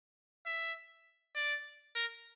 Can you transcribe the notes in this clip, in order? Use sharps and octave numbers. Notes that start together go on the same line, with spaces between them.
E5
D5
A#4